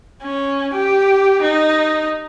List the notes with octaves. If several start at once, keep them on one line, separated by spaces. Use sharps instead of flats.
C#4
G4
D#4